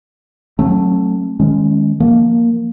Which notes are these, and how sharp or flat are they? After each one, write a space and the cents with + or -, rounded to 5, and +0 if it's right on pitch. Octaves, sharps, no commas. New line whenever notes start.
F#3 +5 A3 +0 C#4 -40
D#3 +0 G#3 +0 C#4 +0
F3 +0 A#3 +0